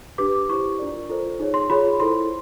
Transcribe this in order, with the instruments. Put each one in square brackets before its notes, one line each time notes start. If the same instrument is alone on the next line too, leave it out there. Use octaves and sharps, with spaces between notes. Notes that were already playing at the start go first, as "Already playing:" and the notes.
[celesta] D4 G4 B4 D6
E4 G4 C5 C#6
D4 F4 A#4 D5
F4 A4 C5
D#4 G#4 C#5
C6
F4 G#4 C#5 B5
E4 A4 C5 C6